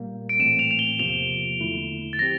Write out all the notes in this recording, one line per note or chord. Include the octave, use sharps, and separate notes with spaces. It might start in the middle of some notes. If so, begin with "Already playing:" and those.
Already playing: A#2 G3 A#3
D7
A2 E3 A3 C4 E7
F7
F7
G7
E2 C3 F3 A#3 F4 F7
E2 D3 A3 E4
A6
F3 C4 G4 A#6